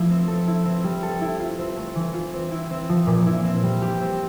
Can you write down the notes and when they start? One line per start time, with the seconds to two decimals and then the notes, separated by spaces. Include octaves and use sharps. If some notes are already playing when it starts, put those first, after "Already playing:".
Already playing: F3 A3 E4
0.10 C4
0.28 A4
0.47 E4
0.66 C4
0.84 G3
1.03 A4
1.21 E4
1.40 F4
1.59 C4
1.77 A3
1.95 E3
2.14 F4
2.33 C4
2.51 E4
2.71 C4
2.89 F3
3.07 A#2
3.26 E4
3.44 C4
3.63 G3
3.82 G4
4.01 C4